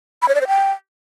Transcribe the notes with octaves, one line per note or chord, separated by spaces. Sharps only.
B5
C#5
D5
C5
G5